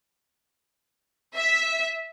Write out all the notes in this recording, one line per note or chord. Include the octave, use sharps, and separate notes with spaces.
E5